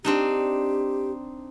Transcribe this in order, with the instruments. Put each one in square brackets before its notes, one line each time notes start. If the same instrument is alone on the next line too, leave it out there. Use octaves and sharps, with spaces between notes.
[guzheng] C4 D4 D#4 [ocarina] G4